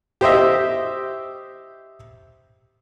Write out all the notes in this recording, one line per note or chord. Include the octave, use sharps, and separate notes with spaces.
G4 C5 D#5 E5